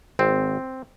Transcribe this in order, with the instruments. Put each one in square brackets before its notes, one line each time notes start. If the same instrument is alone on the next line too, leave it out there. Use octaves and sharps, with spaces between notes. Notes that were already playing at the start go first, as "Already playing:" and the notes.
[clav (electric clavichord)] G#1 C4